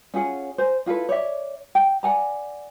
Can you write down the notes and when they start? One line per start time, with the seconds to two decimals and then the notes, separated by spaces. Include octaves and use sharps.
0.14 C#4 F4 G#4 F#5
0.58 C5 G#5
0.86 E4 F4 A4 B4
1.09 C#5 D5 E5
1.75 G5
2.03 D5 F#5 G#5 A#5